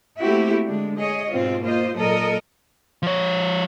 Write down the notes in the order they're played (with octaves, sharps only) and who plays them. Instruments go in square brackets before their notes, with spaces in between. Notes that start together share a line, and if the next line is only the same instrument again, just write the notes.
[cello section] A3 A#3 C4 E4 F#4 G4
D3 G#3 D4
G#4 C#5 D#5
G#2 B2 C4 F4
A#3 F4 C5 D#5
A#2 F#3 A4 A#4 D#5
[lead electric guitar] F3 C#5